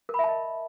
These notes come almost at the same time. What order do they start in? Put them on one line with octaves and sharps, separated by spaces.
A#4 B5 E5 A5 D#5